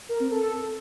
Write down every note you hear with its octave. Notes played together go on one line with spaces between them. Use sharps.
A#4
C4
A4